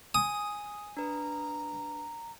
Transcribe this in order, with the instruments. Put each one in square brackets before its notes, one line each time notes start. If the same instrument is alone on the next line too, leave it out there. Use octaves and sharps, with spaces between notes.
[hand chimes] G#5 [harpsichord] D#6
[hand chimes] D4 B4 [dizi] A#5